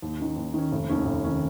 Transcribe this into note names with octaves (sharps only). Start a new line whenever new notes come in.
D#2
D#3 C#4
D#2
D#3 C#4
F1
D#2 D#3 C#4
F1
D#3 C#4